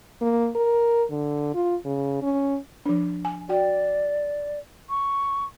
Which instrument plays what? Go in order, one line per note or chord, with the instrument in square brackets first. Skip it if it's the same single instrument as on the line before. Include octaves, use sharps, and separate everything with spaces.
[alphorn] A#3
A#4
D3
F4
C#3
C#4
[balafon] F3 D4
G#5
[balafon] F#4 G5 [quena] D5
[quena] C#6